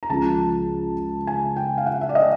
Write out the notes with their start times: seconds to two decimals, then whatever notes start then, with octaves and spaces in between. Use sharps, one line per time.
0.03 A#5
0.10 C#2 C#3 F3 A5
1.27 G#5
1.56 G5
1.78 F5
1.86 F#5
2.01 E5
2.09 D5
2.15 D#5